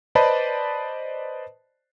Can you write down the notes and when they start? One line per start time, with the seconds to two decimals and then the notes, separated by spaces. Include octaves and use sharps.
0.15 B4 C5 D5 D#5 A5 B5